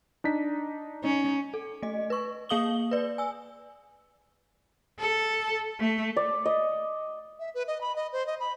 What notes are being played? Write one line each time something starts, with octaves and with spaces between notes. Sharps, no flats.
D4 D#4 B6
C#4 D#4
A4
A3 D#5
B4 C#6
A#3 G#4 F5 D#6 F#7 G7
B4 D5
G#5 E6
A4
A3
D5
D#5
E5
B4
D#5
B5
D#5
C5
D#5
B5